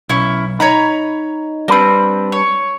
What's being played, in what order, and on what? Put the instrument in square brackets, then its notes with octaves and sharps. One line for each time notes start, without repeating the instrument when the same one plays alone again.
[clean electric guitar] B1 [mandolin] C#4 E4
[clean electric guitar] D#4 [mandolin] C#5 A#5 B5
[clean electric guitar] G3 D4 B4 [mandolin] A#3 C4
[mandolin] C#5